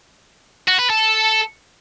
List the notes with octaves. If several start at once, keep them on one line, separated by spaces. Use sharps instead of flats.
F#4
B4
A4